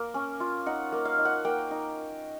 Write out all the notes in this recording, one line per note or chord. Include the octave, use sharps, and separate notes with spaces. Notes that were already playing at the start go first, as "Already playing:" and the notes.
Already playing: A#3
C#4
F4
D#4 F#5
A#3
F5
D#4
F#5
A#3 G5
D#4